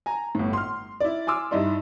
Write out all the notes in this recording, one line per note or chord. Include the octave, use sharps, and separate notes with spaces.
G#5 A#5
G1 A2
C6 F6
E4 D5
G#5 C6 D6 E6 F6
G2 D#4 E4 D5 C6